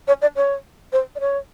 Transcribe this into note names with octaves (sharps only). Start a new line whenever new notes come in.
C#5
D5
C#5
C5
D5
C#5